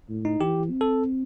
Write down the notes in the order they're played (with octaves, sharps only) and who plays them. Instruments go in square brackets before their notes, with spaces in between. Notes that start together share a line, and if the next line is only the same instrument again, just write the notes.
[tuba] A2
[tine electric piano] D#4
[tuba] E3 [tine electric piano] G4
[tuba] C4
[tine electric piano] A4